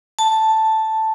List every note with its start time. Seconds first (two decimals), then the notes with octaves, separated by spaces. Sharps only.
0.19 A5